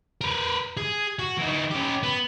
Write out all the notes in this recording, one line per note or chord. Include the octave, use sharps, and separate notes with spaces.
A#4 B4
G#4
F#4
E3 D#4
C#4 G4
B3